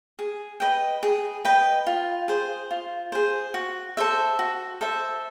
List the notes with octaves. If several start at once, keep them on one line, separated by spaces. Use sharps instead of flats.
G#4
B4 D#5 G5
G#4
B4 D#5 G5
F4
G#4 C5
F4
G#4 C5
F#4
A4 C5 E5
F#4
A4 C5 E5